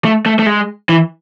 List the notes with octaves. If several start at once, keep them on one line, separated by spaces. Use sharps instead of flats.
A3
A3
A3
G#3
E3